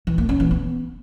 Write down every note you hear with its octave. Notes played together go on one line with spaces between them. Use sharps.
E3
A#3
C#4
E3
B3